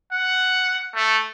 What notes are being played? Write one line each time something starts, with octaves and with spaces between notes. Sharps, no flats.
F#5
A3